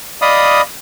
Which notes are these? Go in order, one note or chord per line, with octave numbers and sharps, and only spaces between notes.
D5 D#5 F5 B5 D#6